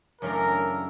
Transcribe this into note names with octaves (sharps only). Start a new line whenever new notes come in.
F#2 C#3 E3 A3 D4 A#4